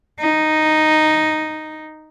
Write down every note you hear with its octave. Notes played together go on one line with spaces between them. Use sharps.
D#4